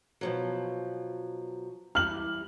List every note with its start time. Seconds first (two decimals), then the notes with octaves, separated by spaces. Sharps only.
0.21 B2 F3 F#3
1.95 E3 G3 F6 F#7